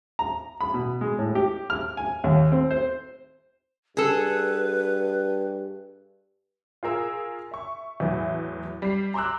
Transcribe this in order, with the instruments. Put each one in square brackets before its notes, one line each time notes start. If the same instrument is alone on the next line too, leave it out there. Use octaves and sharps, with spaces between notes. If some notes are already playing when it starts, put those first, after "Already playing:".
[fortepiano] A#5
B5
B2
G#3
A2
G4
F6
G#5
D#2
C4
C5
[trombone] G2 [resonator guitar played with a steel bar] G#4 A4 [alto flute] B4
[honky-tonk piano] F4 G#4 A#4 E6
E5 C#6
E2 A2 E3 F#3
G3 C7
A#5 C6 D6 E6 F#6